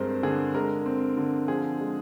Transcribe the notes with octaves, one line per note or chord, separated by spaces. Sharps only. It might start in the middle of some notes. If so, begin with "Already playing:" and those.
Already playing: G2 G#3 C4 A#4 C5
D3 G#4
G#3 A#4
C4
D3
F3 G#4
G#3